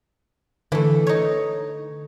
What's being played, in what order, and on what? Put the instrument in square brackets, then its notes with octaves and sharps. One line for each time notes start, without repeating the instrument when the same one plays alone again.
[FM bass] D3 [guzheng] E3 A3
[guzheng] D#4 C#5